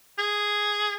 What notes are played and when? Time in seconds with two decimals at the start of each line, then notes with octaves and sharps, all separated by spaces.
0.18 G#4